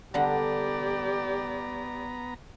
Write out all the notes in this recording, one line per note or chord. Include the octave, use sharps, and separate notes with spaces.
D3 G3 B3 G4 D5 F#5 A#5